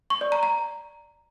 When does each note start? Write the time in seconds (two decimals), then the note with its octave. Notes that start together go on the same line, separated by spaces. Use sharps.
0.10 C#6
0.21 D5
0.32 A#5
0.43 A#5